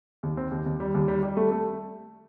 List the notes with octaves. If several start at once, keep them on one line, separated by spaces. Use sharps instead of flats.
D#2
C4
D#2
D#2
G3
D#2
G3
G3
A3
A3